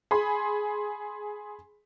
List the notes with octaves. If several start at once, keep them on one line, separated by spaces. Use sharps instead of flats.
G#4 B5 C6